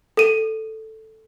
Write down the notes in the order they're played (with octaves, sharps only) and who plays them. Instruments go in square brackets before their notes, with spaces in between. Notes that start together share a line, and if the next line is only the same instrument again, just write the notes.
[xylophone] A4 D#7